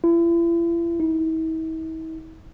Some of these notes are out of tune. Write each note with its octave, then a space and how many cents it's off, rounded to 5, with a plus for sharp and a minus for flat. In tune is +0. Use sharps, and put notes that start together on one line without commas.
E4 +40
E4 -45